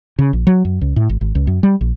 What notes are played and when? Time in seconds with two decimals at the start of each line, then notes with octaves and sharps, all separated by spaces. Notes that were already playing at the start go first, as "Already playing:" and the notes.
0.19 C#3
0.33 A#1
0.47 F#3
0.65 F#2
0.81 C#2
0.96 A2
1.09 G#1
1.21 G#1
1.35 C#2
1.47 F#2
1.63 G3
1.81 A#1